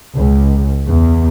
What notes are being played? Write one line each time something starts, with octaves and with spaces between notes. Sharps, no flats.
C#2
E2